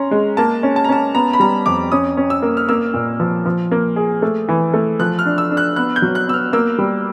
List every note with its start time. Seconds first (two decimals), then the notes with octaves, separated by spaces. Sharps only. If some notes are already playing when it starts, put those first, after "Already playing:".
Already playing: C#4 A#5 C6
0.11 G#3
0.37 A#3 A5
0.63 C#4
0.76 A5
0.84 A#5
0.89 C#4 A5
1.15 B3 A#5
1.33 B5
1.40 G3 A#5
1.66 F2 D6
1.92 C#4 D#6
2.17 C#4
2.30 E6
2.42 A#3
2.57 F6
2.69 A#3 E6
2.94 A#2
3.20 F3
3.45 F3
3.71 A#3
3.96 G#4
4.22 A3
4.48 E3
4.74 A3
4.99 F3 F#6
5.19 F6
5.26 D4
5.38 E6
5.51 D4
5.57 F#6
5.76 B3 F#6
5.96 G6
6.02 F#3
6.15 F#6
6.27 B3 E6
6.34 F6
6.53 A#3 E6
6.78 G3